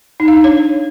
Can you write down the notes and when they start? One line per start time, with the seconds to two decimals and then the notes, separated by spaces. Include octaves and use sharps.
0.20 D#4
0.28 F5
0.36 D4
0.44 C#5